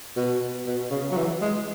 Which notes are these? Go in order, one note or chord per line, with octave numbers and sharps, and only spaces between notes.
B2
B2
C#3
F#3
E3
G#3